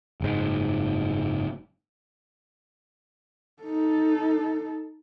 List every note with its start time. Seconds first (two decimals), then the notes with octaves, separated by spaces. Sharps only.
0.21 F#1 G#2
3.63 D#4 A4